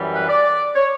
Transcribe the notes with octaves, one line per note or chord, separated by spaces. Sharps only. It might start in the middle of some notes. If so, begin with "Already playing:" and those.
Already playing: F#2 E3 G3
B4
D5
C#5